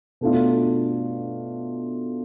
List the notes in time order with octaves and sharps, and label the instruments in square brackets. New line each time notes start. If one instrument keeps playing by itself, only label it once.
[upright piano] B2 A3 D4 F4